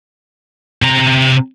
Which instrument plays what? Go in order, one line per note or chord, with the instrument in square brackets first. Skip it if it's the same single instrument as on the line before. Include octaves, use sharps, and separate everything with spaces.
[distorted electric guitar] C3 A#5